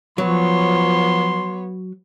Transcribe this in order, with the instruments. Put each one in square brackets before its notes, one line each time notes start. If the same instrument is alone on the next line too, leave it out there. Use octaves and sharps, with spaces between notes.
[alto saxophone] F3 [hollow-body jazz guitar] F#3 [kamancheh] B3 C#5 [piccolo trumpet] C6